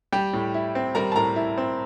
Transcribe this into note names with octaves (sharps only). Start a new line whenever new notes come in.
G3 G4 G5
A2
E4
C4
G3 A#4 A#5
A5
A2 A#4 A#5
E4
C4